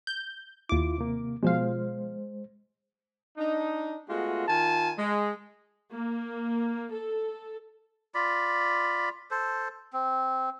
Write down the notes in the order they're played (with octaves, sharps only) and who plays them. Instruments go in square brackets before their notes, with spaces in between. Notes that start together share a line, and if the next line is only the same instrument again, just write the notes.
[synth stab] G6
[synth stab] D#2 D6 [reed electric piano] E4 F4
[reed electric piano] C3 A#3
[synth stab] B2 F3 F5 [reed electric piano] G#3 C5
[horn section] D4 D#4
G#3 A3 B3 F4 F#4
D#3 F4 G#5 A5
G#3
[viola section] A#3
A4
[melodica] F4 D5 B5
A4 C5
C4